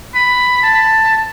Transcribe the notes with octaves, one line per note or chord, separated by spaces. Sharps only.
B5
A5